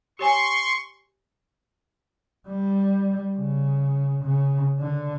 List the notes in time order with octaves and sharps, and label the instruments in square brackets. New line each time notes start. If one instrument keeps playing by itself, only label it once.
[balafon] G4 C#5 G#5 [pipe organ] C6 C#6
[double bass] G3
C#3
C#3
D3